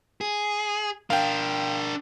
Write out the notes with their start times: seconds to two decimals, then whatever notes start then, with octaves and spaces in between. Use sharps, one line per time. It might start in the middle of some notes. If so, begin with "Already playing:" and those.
0.21 G#4
1.10 D4 A#4 F5 G5